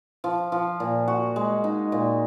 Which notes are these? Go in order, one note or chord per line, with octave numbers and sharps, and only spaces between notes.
F3
F3
A#2
F#4
G#3
D#4
A#2